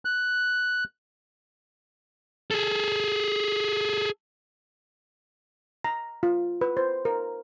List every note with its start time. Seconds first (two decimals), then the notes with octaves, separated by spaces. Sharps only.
0.05 F#6
2.51 G#4 A4
5.85 A#5
6.23 F4
6.61 B4
6.77 C5
7.05 A#4